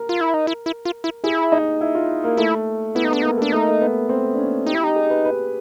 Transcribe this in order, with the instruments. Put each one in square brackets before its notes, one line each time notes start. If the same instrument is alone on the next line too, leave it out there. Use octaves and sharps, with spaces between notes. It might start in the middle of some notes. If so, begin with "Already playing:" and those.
Already playing: [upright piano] A#4
[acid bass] F4
E4
D#4
E4
E4
F4
E4
[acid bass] E4 [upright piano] G#4
[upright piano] D#4
E4
F4
A#3
[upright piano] A3 [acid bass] E4
[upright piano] B3 [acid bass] E4
[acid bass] D#4
[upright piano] B3 [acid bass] D4
[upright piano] A#3 [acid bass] D#4
[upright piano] A3 [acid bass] D4
[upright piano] A3 [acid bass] D#4
[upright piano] A#3
A3
B3
C4
D4
C#4
[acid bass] D#4 [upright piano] G4
[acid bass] E4
[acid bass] D#4 [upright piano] G4
[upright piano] G#4
B4
B4